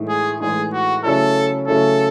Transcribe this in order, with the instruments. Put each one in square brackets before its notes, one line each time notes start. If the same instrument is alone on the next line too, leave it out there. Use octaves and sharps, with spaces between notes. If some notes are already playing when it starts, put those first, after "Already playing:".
Already playing: [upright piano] A2 E3 G#3 D#4
[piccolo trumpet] G#4
[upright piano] A2 E3 G#3 D#4 [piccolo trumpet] G#4
[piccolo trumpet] F#4
[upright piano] C#3 F#3 A3 C#4 E4 [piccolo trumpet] A4
[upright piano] C#3 F#3 A3 C#4 E4 [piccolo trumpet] A4